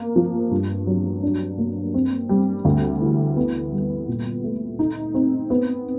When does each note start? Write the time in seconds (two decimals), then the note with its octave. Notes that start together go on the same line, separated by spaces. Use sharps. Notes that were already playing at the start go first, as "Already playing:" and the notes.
Already playing: A#3
0.16 F3
0.51 G2
0.87 F#3
1.23 D4
1.58 A#3
1.94 C4
2.29 G3
2.65 D2
3.01 E3
3.36 B3
3.72 G3
4.08 A#2
4.43 A3
4.79 D#4
5.14 C4
5.50 B3